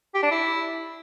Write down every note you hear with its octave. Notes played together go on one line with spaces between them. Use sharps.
G4
D4
E4